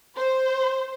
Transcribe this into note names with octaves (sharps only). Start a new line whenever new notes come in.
C5